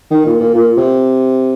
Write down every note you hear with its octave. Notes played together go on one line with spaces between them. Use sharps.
D#3
A#2
A#2
A#2
C3